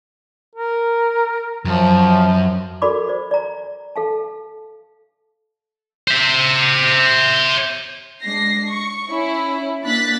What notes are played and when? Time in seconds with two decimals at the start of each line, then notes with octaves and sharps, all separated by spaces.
0.55 A#4
1.65 F#2 F3
2.82 F#4 A4 A#4 D5 B5 D6
3.08 C5 D5
3.31 D5 A#5
3.96 A4 F5 A5
6.08 C5 E5
8.23 G#3 D4 A#6 C7
8.69 C#6
9.10 C#4 E4
9.84 A#3 D4 F#6 A6 B6